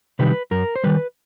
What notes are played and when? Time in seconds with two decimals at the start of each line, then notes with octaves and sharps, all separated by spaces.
0.19 C3 D#3 G3 B4
0.51 F#2 A#4
0.76 C5
0.84 D#3 G3 B4